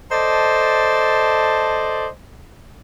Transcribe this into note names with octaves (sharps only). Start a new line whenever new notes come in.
A4 C5 D5 D#5 A5